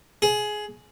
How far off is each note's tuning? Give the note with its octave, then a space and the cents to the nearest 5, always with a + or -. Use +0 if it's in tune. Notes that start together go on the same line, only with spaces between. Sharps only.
G#4 +15